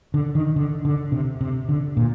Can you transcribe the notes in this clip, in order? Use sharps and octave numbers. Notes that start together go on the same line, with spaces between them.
D3
D#3
D3
D3
C3
C3
D3
A#2